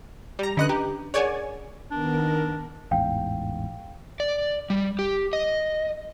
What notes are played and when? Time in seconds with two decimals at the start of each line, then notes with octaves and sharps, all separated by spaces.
0.39 G3 A#5
0.57 D3 C#4 D4 B4 D#5 F#6
0.69 G4 A#5
1.14 G#4 A#4 C#5 D5 F#5 G#5
1.91 D#3 B3 D4 A#4
2.91 A1 E2 G#2 F5 G5
4.20 D5
4.70 G3
4.99 G4
5.33 D#5